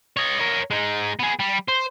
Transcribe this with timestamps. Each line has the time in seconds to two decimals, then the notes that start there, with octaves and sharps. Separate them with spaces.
0.17 C#5 D#5
0.39 A#4 C#5
0.70 G#3 D#4
1.19 B3 G#4
1.39 G3
1.68 C5